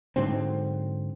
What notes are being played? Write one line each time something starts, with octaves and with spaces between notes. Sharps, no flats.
G#2 D3 F#3 C4